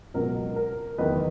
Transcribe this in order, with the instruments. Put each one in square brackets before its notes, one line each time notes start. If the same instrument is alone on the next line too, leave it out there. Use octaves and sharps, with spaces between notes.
[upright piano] C#2 B2 F#3 A#4
A#4
F#1 E2 D#3 B4 D#5